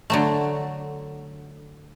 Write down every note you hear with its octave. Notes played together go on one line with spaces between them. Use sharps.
D3 F#3 A3